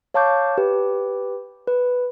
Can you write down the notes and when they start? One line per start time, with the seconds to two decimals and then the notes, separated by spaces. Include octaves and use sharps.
0.14 C#5 F5 A5 C#6 D6 G6
0.58 G4 B4
1.68 B4